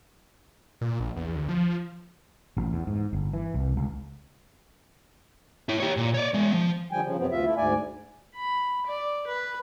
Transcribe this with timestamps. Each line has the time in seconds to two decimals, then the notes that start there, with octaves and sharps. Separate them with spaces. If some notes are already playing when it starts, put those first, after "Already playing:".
0.81 A#2
1.00 A#1
1.16 E2
1.35 D2
1.49 F3
2.57 A1
2.73 E2
2.87 G#2
3.13 G1
3.33 E3
3.54 C2
3.77 C#2
5.69 E4 C#5
5.80 G4 C#5
5.97 A#2
6.14 C#5 D5
6.34 G#3 B3
6.53 F3
6.91 D3 F3 G3 G5 G#5
7.04 C#3 F3
7.19 F#2 C3 F#3 B3 C4
7.31 D2 F4 E5
7.45 A3 E4
7.57 D2 G#2 D5 G#5
8.35 B5
8.86 D5
9.27 B4